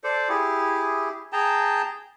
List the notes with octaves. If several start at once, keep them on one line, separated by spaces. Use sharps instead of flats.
A4 C5 D5
E4 G4 G#4
G#4 G5 A5 A#5